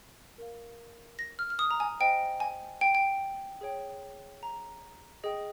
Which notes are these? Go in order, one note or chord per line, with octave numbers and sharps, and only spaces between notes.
A#4 F5
A#6
F6
F6
D#6
A#5
G#5
C5 D#5 G5
G#5
G5
G5
G#4 C#5 G5
A#5
G#4 D#5 G5